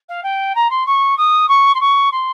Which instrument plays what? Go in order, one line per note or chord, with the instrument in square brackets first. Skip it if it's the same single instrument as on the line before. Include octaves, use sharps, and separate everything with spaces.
[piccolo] F5
G5
A#5
C6
C#6
D#6
C#6
C6
C#6
C6